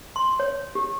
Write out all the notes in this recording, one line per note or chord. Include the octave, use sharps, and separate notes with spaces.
C6
C#5
G4